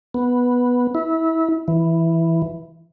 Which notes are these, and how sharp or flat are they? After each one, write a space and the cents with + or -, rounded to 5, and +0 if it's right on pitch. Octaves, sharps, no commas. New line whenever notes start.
B3 -5
E4 -25
E3 +0